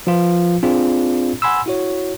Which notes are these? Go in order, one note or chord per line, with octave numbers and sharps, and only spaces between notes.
F3 F4 B4
C4 D4 F4 G#4 D5
F#5 G#5 B5 C6 E6
E4 F#4 C#5